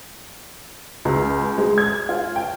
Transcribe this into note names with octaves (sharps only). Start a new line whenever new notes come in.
C#2
G#3
G#6
F4
G5